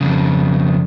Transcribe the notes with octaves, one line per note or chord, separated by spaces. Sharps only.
F2 C#3